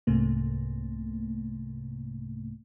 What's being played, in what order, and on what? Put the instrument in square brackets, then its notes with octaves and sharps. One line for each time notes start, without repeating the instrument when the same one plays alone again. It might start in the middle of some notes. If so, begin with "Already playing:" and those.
[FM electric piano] C2 G#2 C3 A3 A#3